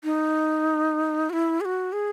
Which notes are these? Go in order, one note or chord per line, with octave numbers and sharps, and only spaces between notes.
D#4
F#4
E4
G#4
F#4
G#4